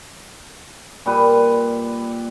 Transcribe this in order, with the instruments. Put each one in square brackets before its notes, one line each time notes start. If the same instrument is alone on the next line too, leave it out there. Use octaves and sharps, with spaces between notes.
[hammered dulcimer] A#2 G3 B4